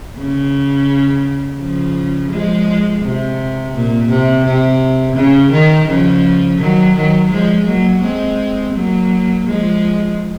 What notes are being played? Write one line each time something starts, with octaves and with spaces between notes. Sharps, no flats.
C#3
C#3 F3
F3 G#3
C3
A#2
C3
C3
C#3
D#3
C#3 F3
D#3 F#3
D#3 F#3
F3 G#3
F#3 A#3
G#3 C4
F#3 A#3
F3 G#3